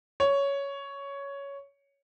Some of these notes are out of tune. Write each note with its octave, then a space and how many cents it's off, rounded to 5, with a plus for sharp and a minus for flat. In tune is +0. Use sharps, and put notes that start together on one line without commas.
C#5 +10